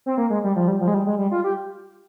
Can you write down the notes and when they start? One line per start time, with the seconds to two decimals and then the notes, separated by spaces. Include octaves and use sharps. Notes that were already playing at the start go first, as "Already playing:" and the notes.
0.06 C4
0.18 A#3
0.30 G#3
0.44 G3
0.56 F3
0.68 G3
0.81 F3
0.88 G#3
0.94 G3
1.06 G#3
1.18 G3
1.32 F4
1.44 G4